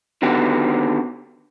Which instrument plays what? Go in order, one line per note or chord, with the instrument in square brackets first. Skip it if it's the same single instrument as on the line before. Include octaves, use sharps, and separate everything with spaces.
[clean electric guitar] D3 D#3 B3 F#4 G4